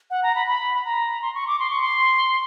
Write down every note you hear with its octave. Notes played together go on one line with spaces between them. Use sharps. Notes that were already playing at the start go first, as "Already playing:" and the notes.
F#5
A#5
B5
B5
B5
A#5
C6
C#6
D6
C6
C#6
C6